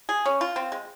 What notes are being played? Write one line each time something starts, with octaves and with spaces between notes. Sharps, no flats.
G#4
C#4
F4
C4
G#3